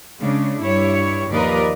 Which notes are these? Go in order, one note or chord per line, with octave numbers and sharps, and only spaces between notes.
C#3 G#3 D4
G2 E4 C#5
D#2 F3 A#4 B4 D5 D#5